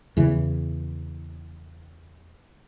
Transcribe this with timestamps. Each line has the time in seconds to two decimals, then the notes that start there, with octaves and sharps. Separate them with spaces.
0.17 E2 C#3 E3